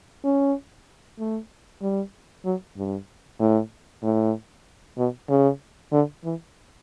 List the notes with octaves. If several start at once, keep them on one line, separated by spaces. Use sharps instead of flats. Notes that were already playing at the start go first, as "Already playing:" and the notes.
C#4
A3
G3
F#3
G2
A2
A2
B2
C#3
D3
E3